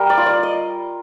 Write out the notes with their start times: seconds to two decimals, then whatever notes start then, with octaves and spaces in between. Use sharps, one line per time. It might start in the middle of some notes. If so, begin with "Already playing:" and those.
Already playing: G3 A#4
0.10 D5
0.18 F4
0.26 D5
0.43 D#5